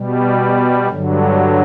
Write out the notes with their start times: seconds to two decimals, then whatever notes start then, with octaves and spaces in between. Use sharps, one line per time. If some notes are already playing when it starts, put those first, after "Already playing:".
Already playing: B2 G3
0.88 G2 D3 F#3